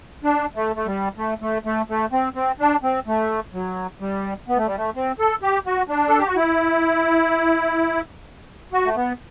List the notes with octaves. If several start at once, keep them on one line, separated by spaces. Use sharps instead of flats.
D4
A3
A3
G3
A3
A3
A3
A3
C4
C4
D4
C4
A3
F#3
G3
B3
A3
G3
A3
C4
A4
G4
F#4
D4
A4
G4
F#4
E4
F#4
A3
B3